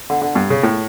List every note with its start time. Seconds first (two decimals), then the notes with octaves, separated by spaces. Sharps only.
0.10 D3
0.22 D3
0.35 G2
0.50 C#3
0.63 A2